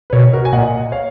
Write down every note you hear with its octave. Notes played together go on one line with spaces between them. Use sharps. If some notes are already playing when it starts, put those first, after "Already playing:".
B4
B2 A#4 C#5
F#4 A#4
G#5
A#2 D#5 F#5
C#5 F5